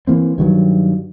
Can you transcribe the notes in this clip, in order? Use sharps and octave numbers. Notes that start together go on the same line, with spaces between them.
E3 A#3 C4
G2 D#3 F#3